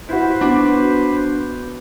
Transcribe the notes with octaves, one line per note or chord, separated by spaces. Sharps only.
E4 F#4 B4 C5
B3 D4 F#4 D6